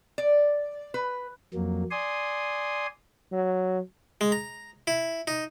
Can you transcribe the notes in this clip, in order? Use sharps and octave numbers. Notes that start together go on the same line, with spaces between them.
D5
B4
F2 F#3 A#3
D5 G#5 C6 D#6
F#3
G#3
A#5
E4
D#4